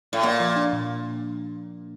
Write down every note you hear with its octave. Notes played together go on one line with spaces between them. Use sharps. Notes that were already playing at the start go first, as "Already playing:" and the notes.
A2
A#2 A#3
F3
D4
A#2